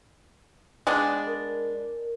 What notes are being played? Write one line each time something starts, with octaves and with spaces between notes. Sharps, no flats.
G#3 B3 D4
A#4